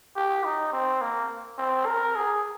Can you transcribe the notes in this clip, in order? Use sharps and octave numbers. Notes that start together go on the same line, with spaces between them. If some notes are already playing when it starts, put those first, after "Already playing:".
G4
D#4
C4
A#3
C4
A#4
G#4